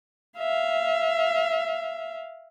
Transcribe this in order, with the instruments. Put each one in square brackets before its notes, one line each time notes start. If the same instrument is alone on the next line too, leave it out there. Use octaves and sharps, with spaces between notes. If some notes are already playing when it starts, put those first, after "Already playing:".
[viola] E5 F5